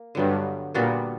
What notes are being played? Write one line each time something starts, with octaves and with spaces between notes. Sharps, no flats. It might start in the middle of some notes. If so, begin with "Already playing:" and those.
Already playing: A#3
G2 D3 F#3 B3
A#2 G3 B3 D4 F#4